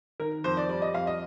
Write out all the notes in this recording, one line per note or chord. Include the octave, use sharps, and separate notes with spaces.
D#3 A#4
F2 C5
D5
G3 D5
D#5
F2 F5
D#5